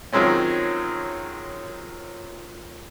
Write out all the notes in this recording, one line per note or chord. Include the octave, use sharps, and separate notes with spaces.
D#3 F3 F#3 G#3 C4 C#4